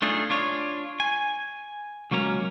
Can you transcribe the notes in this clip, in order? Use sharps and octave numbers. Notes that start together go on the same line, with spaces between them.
A3 D4 D#4 F4 G#4
D4 F4 C#5
G#5
C#2 F#3 A#3 C#4 A#5